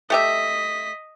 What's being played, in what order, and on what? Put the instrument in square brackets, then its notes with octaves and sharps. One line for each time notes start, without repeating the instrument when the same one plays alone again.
[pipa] A3 G4 E5 [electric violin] D#5 B6